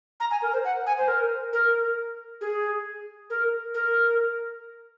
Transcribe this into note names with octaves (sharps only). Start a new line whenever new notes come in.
A#5
G#5
A#4
C5
F#5
G#5
C5
A#4
A#4
G#4
A#4
A#4